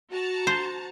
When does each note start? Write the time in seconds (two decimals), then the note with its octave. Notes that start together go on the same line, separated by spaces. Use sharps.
0.10 F#4 A5 A#5
0.47 C5